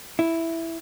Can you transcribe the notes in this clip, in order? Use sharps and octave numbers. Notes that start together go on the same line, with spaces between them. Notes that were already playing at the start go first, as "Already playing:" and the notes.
E4